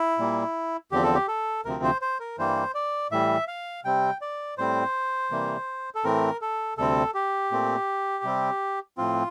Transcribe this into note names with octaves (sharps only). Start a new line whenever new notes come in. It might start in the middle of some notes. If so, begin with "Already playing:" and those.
Already playing: E4
A#2 G3 A#3
E2 D3 F3 C4 G4
A4
G4
A4
D2 C3 F3 C4 A#4
C5
C5
A#4
G2 E3 G3 A#3 C5
D5
A2 E3 G3 E5
F5
C3 G3 C4 G5
D5
A2 G3 C4 C5
C3 E3 G3 A#3
A4
A2 E3 A3 C4 A#4
A4
D2 C3 G3 C4 A4
G4
A#2 A3 C4
C3 G3 C4
A2 F3 C4 F4